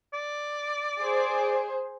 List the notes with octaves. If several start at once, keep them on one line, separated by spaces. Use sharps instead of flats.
D5
G#4 C5